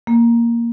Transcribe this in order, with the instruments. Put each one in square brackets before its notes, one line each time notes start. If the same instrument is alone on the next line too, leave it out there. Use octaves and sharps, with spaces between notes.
[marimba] A#3